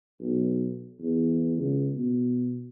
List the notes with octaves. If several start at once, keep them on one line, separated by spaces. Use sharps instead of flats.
B1
E2
C#2
B2